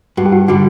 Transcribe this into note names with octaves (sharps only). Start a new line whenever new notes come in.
G2 F#4
G4
F#4
D3 G3 F#4